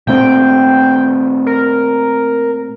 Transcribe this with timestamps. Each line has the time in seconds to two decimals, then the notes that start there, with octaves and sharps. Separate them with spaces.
0.07 A#2 A3 C4 G5
1.46 A#4